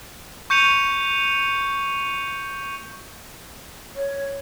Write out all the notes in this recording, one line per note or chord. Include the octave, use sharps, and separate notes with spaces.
C#6 G6 C#7 D#7 F7
C#5